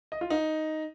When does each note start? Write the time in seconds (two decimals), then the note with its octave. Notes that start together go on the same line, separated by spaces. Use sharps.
0.12 D#5
0.21 F4
0.30 D#4